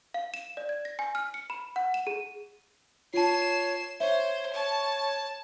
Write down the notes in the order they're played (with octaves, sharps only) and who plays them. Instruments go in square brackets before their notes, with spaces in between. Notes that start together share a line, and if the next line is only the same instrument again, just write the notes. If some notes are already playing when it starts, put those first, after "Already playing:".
[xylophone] F5
E7
D5
G#6
A#6
G#5
F6
C#7
B5
F#5
E7
G#4
[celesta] F4 A5 [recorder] C#5 [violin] C7 E7
[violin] C5 [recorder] C#5 [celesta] E5
[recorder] C#5 [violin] A5